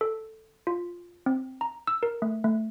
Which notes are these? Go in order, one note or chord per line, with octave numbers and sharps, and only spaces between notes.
A4
F4
C4
A#5
E6
A#4
A3
A3